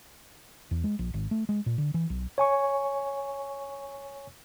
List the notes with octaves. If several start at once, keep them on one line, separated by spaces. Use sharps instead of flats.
E2
G#3
A#1
G#1
A3
G#3
A#2
D3
E3
B1
C#5 G#5 C#6